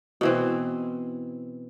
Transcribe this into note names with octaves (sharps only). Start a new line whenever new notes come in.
B2 E3 C4